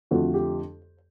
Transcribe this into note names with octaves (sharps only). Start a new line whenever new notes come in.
F2 D3 F3 A3 F#4
G4